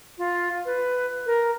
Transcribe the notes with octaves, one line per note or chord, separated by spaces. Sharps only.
F4
B4
A#4